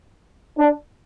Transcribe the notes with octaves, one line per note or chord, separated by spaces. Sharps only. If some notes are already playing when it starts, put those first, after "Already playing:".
D4